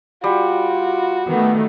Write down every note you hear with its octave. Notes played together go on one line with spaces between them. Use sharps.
G3 F4 F#4
D#3 A3 B3